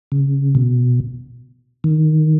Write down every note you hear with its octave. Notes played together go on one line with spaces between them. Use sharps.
C#3
B2
D#3